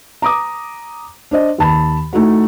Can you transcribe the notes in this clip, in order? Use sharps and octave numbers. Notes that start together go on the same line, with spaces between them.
A#5 D6 D#6
D4 C5 D#5
D#2 A5 B5
A3 D#4 E4 F#4